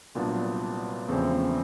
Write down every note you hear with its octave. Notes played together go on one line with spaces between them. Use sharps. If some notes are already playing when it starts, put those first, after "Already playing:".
C2 A#2 F#3 B3 D4
E2 C#3 F3 A3 C4